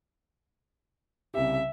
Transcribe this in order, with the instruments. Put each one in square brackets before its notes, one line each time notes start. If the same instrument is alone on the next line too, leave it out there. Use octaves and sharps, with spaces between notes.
[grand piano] C2 C#3 G4 [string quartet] E5